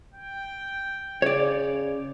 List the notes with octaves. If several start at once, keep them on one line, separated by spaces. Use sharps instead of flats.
G5
C#3 C#5 D5